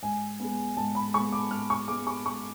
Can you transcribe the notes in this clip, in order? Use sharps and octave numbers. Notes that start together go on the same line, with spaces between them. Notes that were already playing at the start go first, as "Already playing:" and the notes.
G#2 G#5
G#3 B3
G#2 A5
B5
G#3 B3 C#6
D6
G#2 F6
C#6
G#3 B3 D6
C#6
G#2 C#6